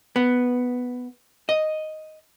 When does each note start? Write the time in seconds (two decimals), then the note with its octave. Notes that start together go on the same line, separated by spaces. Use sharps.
0.16 B3
1.49 D#5